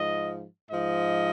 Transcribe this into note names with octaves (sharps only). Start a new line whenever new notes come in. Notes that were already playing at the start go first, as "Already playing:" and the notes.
Already playing: G#2 F3 D#5
G#2 F3 D#5